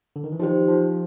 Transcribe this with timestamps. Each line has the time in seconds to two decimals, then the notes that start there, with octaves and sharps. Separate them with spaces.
0.16 D3
0.24 D#3
0.32 E3
0.40 F3 D#4 G4 C5
0.68 F3